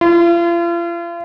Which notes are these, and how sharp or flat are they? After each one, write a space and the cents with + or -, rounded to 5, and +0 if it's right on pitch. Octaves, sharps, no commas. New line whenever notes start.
F4 -40